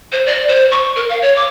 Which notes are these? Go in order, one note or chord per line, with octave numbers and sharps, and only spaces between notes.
C5
D5
C5
C#6
A#4
F5
C#5
D6